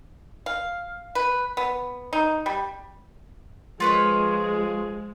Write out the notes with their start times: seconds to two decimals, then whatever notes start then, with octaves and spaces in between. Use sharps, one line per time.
0.46 F5
1.15 B4
1.57 B3
2.13 D#4
2.46 G3
3.80 F3 G#3 F4 G#4 B4 C#5